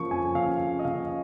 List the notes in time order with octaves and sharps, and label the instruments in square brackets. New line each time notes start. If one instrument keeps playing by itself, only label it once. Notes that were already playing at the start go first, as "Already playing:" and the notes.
Already playing: [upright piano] C#3 F3 A#3 C#6
F2 G#5
C#3 F5
C#3
D#5
C#3 F5